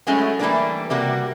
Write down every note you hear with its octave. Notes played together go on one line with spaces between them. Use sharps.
F#3 G#3 A3 C#4 E4
E3 G3 A3 A#3 D4 B4
C3 G3 A#3 F#4 A#4